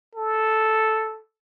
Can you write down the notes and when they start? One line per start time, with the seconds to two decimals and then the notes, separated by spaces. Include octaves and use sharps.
0.15 A4